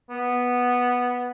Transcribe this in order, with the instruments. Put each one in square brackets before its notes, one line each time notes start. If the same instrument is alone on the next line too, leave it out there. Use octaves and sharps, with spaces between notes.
[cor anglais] B3